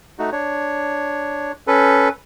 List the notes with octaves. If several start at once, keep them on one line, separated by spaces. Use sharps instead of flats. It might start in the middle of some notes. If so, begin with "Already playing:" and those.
A3 D#4 F#4
D4 C#5
C#4 A4 B4